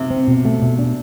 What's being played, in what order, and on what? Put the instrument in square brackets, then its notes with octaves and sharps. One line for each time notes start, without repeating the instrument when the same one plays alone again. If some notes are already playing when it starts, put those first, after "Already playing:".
Already playing: [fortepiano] C3
[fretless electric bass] C4
B2
A3
B2
D4